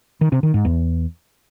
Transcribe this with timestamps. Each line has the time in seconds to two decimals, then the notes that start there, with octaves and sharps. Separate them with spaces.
0.21 D#3
0.32 C3
0.43 D#3
0.54 G#2
0.65 E2